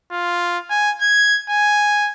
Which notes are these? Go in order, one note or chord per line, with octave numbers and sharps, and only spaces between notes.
F4
G#5
G#6
G#5